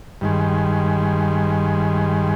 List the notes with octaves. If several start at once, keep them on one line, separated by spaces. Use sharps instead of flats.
G2 D#3 G#3